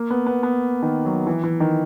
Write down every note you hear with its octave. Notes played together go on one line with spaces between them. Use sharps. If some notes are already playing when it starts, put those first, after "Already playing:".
Already playing: A#3
B3
B3
B3
D#3
F#3
E3
E3
D#3